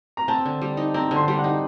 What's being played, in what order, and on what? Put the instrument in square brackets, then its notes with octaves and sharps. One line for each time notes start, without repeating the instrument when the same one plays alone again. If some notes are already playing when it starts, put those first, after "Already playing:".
[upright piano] A#5
[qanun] C4 [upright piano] A5
[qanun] D3
G3
D#4
[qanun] C4 [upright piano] A#5
[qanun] D3
[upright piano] C6
[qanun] G3
[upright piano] F#5
[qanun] D#4